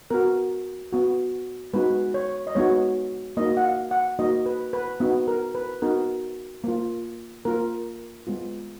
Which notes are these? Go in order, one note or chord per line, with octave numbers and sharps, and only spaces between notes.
B3 F#4 A#4
B3 F#4
G#3 B3 D#4 F#4 B4
C#5
D#5
G#3 B3 D#4 F#4 C#5
A#3 D#4 F#4 D#5
F#5
F5
F#5
A#3 D#4 F#4 D#5
B4
B4
B3 D#4 F#4
A#4
B4
B3 D#4 F#4 A#4
A#3 F4
A#3 F4 A#4
G#3 B3 F4